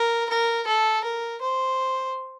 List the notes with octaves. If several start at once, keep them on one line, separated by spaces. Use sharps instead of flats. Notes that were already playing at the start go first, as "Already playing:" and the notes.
Already playing: A#4
A#4
A4
A#4
C5